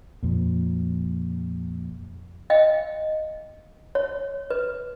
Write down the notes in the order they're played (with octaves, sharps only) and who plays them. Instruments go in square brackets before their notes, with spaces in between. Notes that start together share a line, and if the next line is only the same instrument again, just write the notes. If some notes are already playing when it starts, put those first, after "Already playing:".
[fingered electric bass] F2 A#2
[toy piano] D#5 F5 G5
C#5
B4